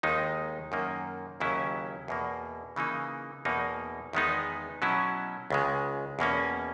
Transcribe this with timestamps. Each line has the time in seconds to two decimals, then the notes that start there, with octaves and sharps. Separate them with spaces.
0.03 D#2 D#3 G#3 D#4
0.72 F#2 D#3 A#3
1.40 D#2 C#3 F#3 C#4 E4
2.08 E2 B2 A#3
2.76 C#3 E3 A#3 D#4
3.45 E2 B2 A#3 D#4
4.13 E2 D#3 G#3 B3 D#4
4.82 B2 F#3 C#4 E4
5.50 C#2 C#3 G#3
6.19 E2 B2 A#3 C#4